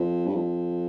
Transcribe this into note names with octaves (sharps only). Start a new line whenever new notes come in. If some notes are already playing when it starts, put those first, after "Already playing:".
Already playing: F2
G2
F2